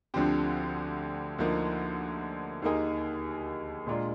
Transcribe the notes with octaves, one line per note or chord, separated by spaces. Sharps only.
D2 D3 F3 C4 G4
D2 D3 F3 A#3 D#4
D#2 D#3 A#3 D#4 G#4
A#2 G#3 D4 F4 A#4